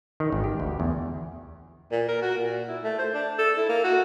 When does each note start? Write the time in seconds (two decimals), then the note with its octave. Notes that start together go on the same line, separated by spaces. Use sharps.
0.20 D#3
0.32 G#1
0.44 G4
0.60 D2
0.80 E2
1.92 A#2
2.08 A#4
2.22 F#4
2.37 A#2
2.68 E4
2.83 A3
2.99 C5
3.14 D4
3.39 A4
3.57 E4
3.69 A#3
3.84 F#4